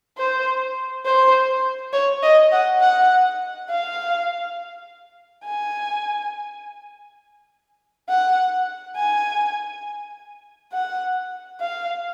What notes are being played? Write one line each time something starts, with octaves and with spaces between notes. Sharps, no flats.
C5
C5
C#5
D#5
F#5
F#5
F5
G#5
F#5
G#5
F#5
F5